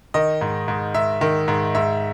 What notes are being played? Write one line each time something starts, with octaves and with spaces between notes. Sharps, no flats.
D#3 D#5
G#2
G#2
G#2 E5
D#3
G#2
G#2 E5